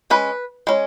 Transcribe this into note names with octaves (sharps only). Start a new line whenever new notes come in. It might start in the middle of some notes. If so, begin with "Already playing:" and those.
G#3 C#4 B4
G#3 C#4